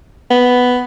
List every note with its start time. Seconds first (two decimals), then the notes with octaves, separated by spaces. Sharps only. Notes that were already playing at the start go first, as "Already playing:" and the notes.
0.30 B3